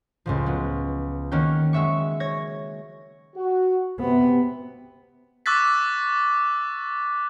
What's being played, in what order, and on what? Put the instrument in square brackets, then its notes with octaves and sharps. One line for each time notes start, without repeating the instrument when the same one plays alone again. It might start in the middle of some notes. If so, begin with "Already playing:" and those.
[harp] C#2 A2 F3
F#3 B3
D#3 A#3 C#4 F#4 G5
F#3 G#3 E5 C#6
C#5 G#6 A#6
[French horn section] F#4
[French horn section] C3 [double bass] B3
[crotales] C#6 D6 E6 F#6 A6 B6